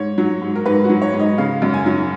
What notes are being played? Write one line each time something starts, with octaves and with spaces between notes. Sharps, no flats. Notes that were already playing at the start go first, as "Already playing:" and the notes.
Already playing: G#2 C#5
F#3
G#2
A#4
G#2 B4
F#4
F#3
C#5
G#2
D#5
C#3 F5
F#2
G#5
F#3